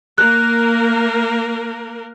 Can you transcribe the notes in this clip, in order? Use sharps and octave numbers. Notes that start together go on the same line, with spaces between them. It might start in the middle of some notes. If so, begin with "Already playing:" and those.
A#3 A#4 F#6